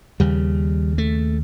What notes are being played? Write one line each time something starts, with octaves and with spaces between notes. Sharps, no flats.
D#2 C#3 G3
A3